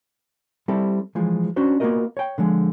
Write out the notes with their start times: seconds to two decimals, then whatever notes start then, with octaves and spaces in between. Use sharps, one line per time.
0.68 G3 C4 E4 A4
1.15 E3 F3 G#3
1.56 C#4 D4 F#4 C5
1.80 A#3 B3 F4 F#4 A#4 D#5
2.17 C#5 G5
2.38 D3 F3 G#3